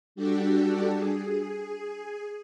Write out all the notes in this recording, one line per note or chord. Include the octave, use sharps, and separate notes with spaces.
G3 D4 F#4 G4 A4
G#4